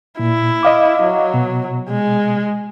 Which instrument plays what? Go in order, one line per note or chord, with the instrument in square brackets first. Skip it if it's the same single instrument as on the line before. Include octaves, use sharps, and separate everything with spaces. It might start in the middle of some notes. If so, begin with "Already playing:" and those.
[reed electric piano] A#2 [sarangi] E4
[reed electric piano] D#5 F5 D6
[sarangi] F#3
[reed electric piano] B2
[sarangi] G#3